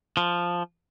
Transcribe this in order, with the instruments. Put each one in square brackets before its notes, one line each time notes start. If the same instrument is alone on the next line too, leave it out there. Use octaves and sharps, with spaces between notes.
[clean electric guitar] F3